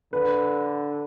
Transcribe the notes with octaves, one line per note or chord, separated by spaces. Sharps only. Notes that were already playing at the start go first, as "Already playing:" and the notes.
D3 B4